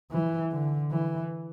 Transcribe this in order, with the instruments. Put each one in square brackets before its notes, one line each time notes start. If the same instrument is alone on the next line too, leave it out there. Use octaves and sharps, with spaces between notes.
[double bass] E3
D3
E3